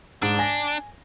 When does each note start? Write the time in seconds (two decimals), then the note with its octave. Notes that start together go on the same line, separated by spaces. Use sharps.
0.23 G#2 D4
0.39 G#5 A#6